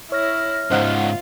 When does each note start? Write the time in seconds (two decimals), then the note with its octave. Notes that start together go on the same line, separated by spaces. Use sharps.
0.12 E4 C#5 F6 A#6
0.71 C#2 G#2 F4 C5 D#5 F#5